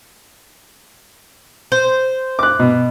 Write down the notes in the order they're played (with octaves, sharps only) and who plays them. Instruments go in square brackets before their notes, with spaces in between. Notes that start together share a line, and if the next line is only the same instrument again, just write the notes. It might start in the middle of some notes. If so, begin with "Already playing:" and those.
[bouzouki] C5
[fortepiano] D6 F#6
B2